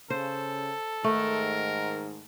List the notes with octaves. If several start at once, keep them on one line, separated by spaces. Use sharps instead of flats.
C#3 A4 C5
G#2 D#3 A3 A#4